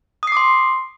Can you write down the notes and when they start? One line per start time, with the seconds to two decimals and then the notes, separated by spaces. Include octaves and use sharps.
0.23 D#6
0.27 C7
0.32 D6
0.37 C6